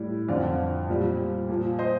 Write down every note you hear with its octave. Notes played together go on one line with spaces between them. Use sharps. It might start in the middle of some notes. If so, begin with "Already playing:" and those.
Already playing: A2 G3
F2 D3 F3 D5 F5
A#2 G3
A#2 F3
C5 D#5